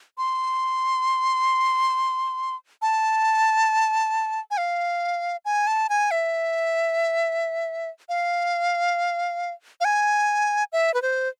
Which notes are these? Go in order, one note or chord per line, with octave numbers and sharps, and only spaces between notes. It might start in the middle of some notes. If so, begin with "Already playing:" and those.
C6
A5
G#5
F5
G#5
A5
G#5
E5
F5
F5
G#5
E5
B4
C5